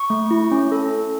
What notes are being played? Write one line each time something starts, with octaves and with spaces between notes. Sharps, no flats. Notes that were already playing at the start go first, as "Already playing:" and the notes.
Already playing: C#6
A3
E4
C#4
A4
A4